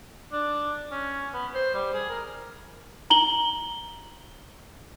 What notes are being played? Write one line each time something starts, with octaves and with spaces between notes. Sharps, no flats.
D4
C#4
B3
C5
G3
G#4
A#4
A#5 F#7 G7